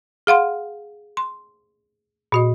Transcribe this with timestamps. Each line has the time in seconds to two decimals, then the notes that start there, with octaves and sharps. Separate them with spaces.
0.27 G#4 F5 F#5 C6
1.17 C6
2.32 A#2 F#4 D#5